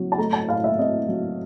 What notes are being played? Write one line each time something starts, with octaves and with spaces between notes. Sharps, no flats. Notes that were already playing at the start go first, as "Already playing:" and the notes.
Already playing: F#3 C4
A5
A3 A#5
A5
A2 F5
E5
C4 D#5
F#3